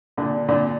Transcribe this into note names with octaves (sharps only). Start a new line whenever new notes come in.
A#2 D3
A#2 D3